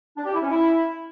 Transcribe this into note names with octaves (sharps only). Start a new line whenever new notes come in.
D4
G4
E4
C#4
E4